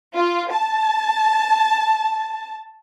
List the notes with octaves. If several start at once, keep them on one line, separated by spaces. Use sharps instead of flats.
F4
A5